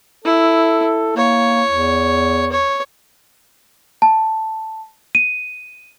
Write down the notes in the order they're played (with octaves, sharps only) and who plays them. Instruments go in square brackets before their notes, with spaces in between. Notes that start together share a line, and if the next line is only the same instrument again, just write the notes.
[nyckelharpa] E4 [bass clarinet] A4
[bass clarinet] A#3 [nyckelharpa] C#5
[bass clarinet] E2
[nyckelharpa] C#5
[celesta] A5
D#7